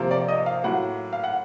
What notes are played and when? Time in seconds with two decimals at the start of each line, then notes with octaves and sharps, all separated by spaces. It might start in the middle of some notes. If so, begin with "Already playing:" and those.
Already playing: C3 F3 A#3
0.11 D5
0.28 D#5
0.46 F5
0.64 A2 F#3 A#3 F#5
1.13 F5
1.24 F#5